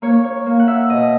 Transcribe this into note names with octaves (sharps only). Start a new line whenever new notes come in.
A#3 C#5
C#5
A#3
F#5
E5
B2 D#5